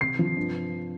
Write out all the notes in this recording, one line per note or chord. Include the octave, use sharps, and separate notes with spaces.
C3 C7
F3
G2